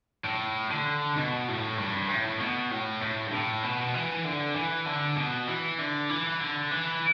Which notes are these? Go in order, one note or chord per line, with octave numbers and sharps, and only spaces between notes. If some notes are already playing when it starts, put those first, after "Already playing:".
A2
D3
B2
A2
G2
A2
B2
A2
A2
G2
A2
B2
E3
D3
E3
D3
B2
E3
D3
E3
D3
E3